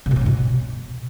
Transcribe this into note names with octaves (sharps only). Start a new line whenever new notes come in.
C#3
A#2
C#4
A2
B2